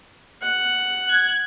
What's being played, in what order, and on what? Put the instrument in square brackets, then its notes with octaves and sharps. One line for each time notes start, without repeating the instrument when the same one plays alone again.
[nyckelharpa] F#5
[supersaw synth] F#6 G#6